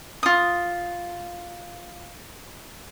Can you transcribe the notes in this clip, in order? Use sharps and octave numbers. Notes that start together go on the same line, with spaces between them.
F4 D#6